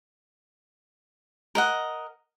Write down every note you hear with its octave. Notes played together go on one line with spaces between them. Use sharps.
A#4 D#5 F#5